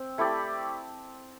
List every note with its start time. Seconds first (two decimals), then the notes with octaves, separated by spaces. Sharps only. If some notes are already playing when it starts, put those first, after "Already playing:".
Already playing: C4
0.18 A3 E4 G4 D5